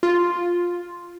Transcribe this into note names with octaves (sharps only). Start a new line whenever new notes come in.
F4